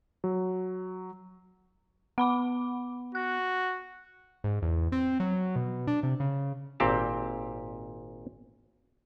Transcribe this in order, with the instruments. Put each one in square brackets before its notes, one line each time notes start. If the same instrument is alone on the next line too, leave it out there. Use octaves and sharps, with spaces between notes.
[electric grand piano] F#3
[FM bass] B3 [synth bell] F#5 B5 D6
[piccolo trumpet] F#4 [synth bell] F#6
[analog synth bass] G#2
E2
C4
F#3
B2
D4
C3
C#3
[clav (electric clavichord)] G#1 A#2 C4 G4 A5